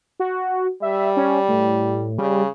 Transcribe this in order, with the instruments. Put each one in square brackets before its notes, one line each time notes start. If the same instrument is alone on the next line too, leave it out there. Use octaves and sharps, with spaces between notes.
[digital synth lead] F#4
[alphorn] G3 [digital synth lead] E5
[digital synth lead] C#4
A2
[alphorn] C#3 [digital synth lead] G3